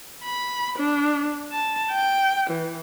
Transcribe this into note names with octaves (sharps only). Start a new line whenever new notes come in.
B5
D4
A5
G5
E3